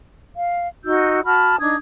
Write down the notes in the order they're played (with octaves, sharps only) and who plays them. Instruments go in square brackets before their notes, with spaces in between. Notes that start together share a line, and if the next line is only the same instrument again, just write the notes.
[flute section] F5
D#4 F#4 E6 G6
F#4 A5 B5 F6
D4 D#4 D#6 G#6